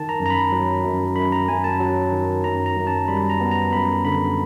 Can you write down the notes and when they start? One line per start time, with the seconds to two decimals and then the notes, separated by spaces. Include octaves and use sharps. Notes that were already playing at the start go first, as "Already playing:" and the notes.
Already playing: D#3 A5
0.09 A#5
0.20 F#2
0.26 A#5
0.30 B5
0.52 F#3
0.84 F#2
1.16 F#2 B5
1.32 A#5
1.48 F#2 G#5
1.64 A5
1.80 F#3
2.12 D#3
2.44 F#2 A#5
2.66 A#5
2.77 F#2
2.87 A5
3.08 G3 B5
3.30 A#5
3.40 B3
3.51 A#5
3.72 F#2 B5
4.05 D3 B5